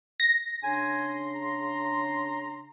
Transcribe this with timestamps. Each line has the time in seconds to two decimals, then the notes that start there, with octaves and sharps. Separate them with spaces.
0.20 A#6
0.64 C#3 D4 G#5 C6
1.35 A#5